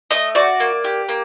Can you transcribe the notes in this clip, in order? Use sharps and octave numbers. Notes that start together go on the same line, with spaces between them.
A3 D#5
F#4 D5
A#3
G4
A#3